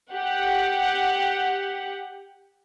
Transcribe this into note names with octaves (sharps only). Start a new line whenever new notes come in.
G4 F#5